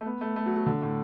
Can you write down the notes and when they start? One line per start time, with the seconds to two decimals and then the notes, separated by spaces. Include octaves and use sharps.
0.01 A3
0.06 B3
0.21 A3
0.36 A3
0.46 F#3
0.56 F#3
0.66 D3
0.82 A2